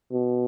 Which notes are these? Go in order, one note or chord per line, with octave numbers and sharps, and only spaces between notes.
B2